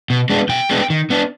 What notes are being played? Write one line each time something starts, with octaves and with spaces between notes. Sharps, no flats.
B2
G#3 B3 D4
B2 G5
G#3 B3 D4
D#3
B3 D4